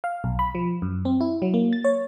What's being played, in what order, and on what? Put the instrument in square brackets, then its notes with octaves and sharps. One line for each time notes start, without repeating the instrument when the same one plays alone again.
[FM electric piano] F5
B1
B5
F3
F#2
C4
E4
F#3
A#3
A6
C#5